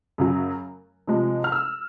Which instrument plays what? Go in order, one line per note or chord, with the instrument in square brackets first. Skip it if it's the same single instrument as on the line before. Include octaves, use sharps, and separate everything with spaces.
[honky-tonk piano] F#2 C#3 F#3
C3 F3 G#3
F6
E6